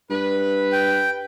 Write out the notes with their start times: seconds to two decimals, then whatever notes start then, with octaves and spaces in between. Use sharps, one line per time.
0.10 G2 B4
0.72 G5